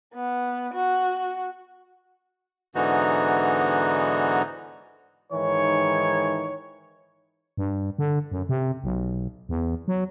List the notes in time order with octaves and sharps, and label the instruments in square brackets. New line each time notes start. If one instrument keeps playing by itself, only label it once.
[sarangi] B3
F#4
[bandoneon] G#2 D3 E3 B3 D#4 F#4
[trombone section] G#2 D#3 E3 [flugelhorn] C#5
[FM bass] G2
D3
F#2
C3
B1
E2
F#3